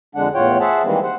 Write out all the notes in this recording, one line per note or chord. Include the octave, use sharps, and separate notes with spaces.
F2 D3 G#3 D4 F#5
E2 A2 F4 C#5 F#5 G5
G#4 C5 E5 F#5 A5
D#3 E3 G3 G#3 A#3 C4
C5 F#5